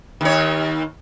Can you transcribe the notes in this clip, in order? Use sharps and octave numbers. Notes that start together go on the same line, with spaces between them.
D#2 C#5